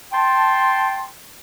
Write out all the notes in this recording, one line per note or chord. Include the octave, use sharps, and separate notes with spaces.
G5 A5 C6